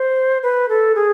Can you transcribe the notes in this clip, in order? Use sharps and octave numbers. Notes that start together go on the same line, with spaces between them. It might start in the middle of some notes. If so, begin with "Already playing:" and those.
Already playing: C5
B4
A4
G#4